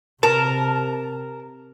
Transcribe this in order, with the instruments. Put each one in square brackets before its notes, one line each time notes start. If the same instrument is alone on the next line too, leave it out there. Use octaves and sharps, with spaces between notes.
[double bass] C3 [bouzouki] A#4 [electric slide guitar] A5